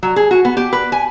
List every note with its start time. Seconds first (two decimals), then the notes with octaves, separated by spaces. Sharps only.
0.03 F#3
0.16 G#4
0.31 F#4
0.45 B3
0.57 G4
0.73 B4
0.92 G#5